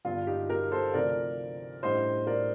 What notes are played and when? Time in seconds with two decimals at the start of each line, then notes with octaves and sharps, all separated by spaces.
0.05 G1 G2 D3 F4
0.27 D#4 G4
0.49 G4 A#4
0.71 A4 C5
0.94 D2 C3 F3 C4 D#4 A#4 D5
1.83 A1 A2 G3 D4 C5 D#5
2.27 A#4 D5